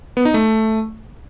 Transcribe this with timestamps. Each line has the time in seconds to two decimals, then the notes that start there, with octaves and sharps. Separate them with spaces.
0.17 B3
0.25 D#4
0.34 A3